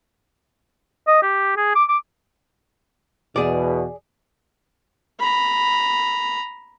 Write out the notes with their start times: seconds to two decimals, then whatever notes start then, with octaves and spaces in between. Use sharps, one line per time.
1.08 D#5
1.22 G4
1.57 G#4
1.75 D6
1.89 D6
3.36 E2 B2 G#4 D5
5.20 A#5 B5